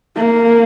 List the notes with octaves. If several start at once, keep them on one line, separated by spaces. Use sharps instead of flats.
A#3